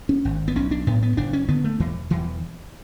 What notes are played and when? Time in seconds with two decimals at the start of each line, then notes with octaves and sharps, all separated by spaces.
0.09 C#4
0.25 G#1
0.48 B3
0.55 B1 C#4
0.71 D4
0.87 A2 B3
1.03 B3
1.17 F#1 D4
1.33 C#4
1.49 D3 B3
1.64 A3
1.80 E1 E3
2.10 E1 E3